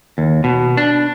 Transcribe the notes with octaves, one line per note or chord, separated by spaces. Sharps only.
D#2
B2
D4